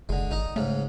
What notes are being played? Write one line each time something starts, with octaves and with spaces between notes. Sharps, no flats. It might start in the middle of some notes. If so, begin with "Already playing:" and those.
F#1 D3 G#3
G#1 D#4 D#5
G#2 C#3 A3